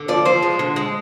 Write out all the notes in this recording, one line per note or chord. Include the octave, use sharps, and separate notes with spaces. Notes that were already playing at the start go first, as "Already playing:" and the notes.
Already playing: D3
F3 D5
F3 C5
G#3
D3
G#3